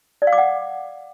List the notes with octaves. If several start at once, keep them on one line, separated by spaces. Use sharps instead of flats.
D5
F5
D6
F#5